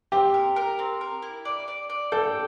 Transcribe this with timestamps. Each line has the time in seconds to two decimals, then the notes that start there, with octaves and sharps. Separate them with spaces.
0.12 C4 G4
0.34 A#4
0.56 A#4
0.79 C4
1.01 A#4
1.22 E4
1.45 D5
1.68 D5
1.90 D5
2.12 A4 G5